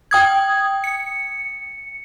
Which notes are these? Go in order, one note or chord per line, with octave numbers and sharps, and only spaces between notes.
G5 D#6 G#6
C#7